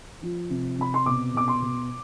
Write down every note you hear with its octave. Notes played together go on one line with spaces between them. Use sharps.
F3
C3
C3 B5
C6
B2 D6
B2 D6
C6
B2